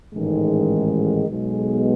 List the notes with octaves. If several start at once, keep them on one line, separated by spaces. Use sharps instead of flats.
A1 G#2 D#3 G#3
B1 B2 G#3